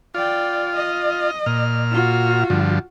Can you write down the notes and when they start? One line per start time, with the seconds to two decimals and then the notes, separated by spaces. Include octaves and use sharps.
0.15 F4 D5 G5
0.76 D#5
1.46 A#2 F6
1.91 F4 F#4
2.50 G2 D3 F3